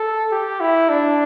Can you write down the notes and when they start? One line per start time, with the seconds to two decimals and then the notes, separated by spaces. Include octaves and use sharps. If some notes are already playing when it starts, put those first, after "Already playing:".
Already playing: A4
0.32 G4
0.60 E4
0.89 D4